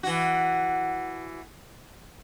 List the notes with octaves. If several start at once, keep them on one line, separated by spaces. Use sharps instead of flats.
E3 F#4